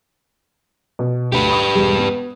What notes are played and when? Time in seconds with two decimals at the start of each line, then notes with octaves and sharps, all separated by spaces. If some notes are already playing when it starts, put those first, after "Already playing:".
0.99 B2
1.32 D2 G4 B4
1.49 B5 C#6 D#6
1.75 E1 G3 G#3
1.98 B3